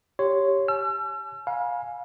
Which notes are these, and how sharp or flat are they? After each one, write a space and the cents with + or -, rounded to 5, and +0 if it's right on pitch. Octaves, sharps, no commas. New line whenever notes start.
G4 +0 C#5 +0 C6 -10
G#5 +45 E6 +45
F5 +25 G#5 +0 B5 -40